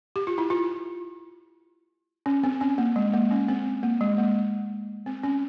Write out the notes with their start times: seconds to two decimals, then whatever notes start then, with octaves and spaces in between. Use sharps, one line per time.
0.16 G4
0.27 F4
0.38 E4
0.50 F4
2.26 C#4
2.44 C4
2.61 C#4
2.78 A#3
2.96 G#3
3.13 A#3
3.31 C#4
3.48 C4
3.83 A#3
4.01 G#3
4.18 A#3
5.06 C4
5.23 C#4